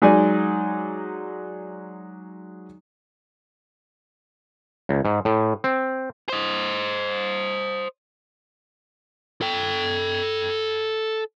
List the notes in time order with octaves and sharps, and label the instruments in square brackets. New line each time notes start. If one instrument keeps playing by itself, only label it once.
[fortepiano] F#3 G#3 D#4 D5 G#5
[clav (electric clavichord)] C#2
G#2
A2
C4
[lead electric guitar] C5 D#5
A4 G5